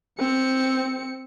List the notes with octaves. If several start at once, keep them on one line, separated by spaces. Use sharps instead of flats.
C4 C#7